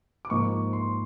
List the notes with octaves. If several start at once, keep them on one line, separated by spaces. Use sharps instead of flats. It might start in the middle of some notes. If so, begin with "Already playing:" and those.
D6
G#2 F3 A#3 C#6
C6